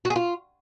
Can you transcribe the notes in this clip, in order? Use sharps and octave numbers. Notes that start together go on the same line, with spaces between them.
F#4
G#4
F4